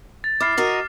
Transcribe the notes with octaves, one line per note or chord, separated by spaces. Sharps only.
A6
E4 D6 F6 C7
F#4 A#4 D#5